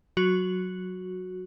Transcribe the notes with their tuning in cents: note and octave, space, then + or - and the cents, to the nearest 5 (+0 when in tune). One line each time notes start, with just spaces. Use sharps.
F#3 +0 F#4 -10